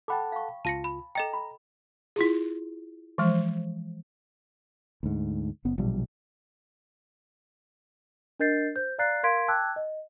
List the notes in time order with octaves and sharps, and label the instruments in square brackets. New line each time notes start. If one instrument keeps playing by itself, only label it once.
[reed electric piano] A4 F#5 A5 [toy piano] G5 B5 D6
[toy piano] F5 C#6
[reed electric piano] C#2 F4 [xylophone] A5 A#6 C#7
[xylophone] B5
[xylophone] A4 D#5 G5 [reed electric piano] A#5
[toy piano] B5
[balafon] E4 F4 G#4
E3 F3 G#3
[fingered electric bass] D2 G#2
F#1 B3
A#1 B2 F#3 G3
[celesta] D4 A#4 D#5 G6 A6 C7
C5 G6
D5 F5 A#5 F#6 A6 C7
A#4 F5 C6 G#6 B6 D7
G5 A5 D6 E6 F#6 G#6
D#5